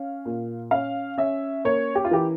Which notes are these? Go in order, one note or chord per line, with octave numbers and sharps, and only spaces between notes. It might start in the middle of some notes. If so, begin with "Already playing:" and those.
Already playing: C#4 F5
A#2
C#4 F5
C#4 E5
A#3 C#5
G4
F4
E3 G4